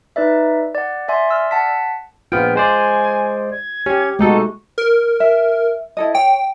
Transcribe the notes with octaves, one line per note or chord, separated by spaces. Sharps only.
D#4 B4 D5 E5
D5 F#5
D5 E5 G#5 C6
D5 E6 F6
F#5 A5 B6
A#1 B3 F4 G5 F6
G#3 C5 D5 G#5
G#6
C#4 G4
B2 G#3 A3 D#4 F#4 A4
A#4
E5
E4 A4 D#5
C#5 G5